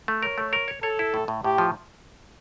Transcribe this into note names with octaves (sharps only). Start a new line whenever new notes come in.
A3
A#4 C#5
A3
A#4
C#5
A4 C#5
E4
A2
A2
A2 G4
F3